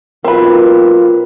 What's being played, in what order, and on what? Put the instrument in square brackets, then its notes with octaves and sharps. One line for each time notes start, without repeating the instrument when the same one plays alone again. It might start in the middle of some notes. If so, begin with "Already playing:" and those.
[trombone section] B1 B2 F4 [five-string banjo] C4 B4 [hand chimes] A#4